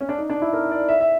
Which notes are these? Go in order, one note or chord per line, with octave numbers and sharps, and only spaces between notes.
C#4
D4
D#4
D4
E4
A#4
D5
E5
E5